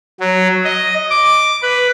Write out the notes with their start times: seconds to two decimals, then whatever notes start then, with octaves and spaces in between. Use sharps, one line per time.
0.20 F#3
0.64 D#5
1.10 D6
1.62 B4